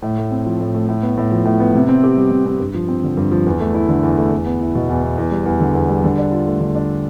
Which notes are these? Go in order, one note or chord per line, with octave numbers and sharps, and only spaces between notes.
A2
A3
C4
F3
A2
A3
A2
B3
A2
F3
A2
B3
C3
C4
G4
G3
C3
C4
G2
F3
C4
D3
G2
F3
E2
A3
E4
D3
E2
A3
E2
B3
E4
B2
E2
B3
E2
G3
E2
D3
E2
G3
D3
D4
F4
A3
D3
D4